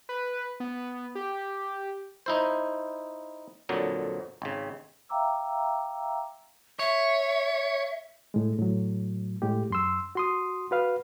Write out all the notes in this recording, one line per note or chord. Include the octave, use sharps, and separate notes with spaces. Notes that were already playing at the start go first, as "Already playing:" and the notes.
B4
B3
G4
D#4 E4 C5
F2 A#2 D3 F#3
G#1 C#3
E5 F5 G5 A#5 D6 E6
C#5 E5
A2 G#3
A2 F#3
A2 G#3 G4
F#2 C6 E6
F#4 C6 D#6
F#4 B4 F5